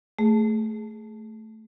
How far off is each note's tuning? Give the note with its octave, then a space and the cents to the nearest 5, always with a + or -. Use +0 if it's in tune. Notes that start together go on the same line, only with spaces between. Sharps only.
A3 +0 G#4 +0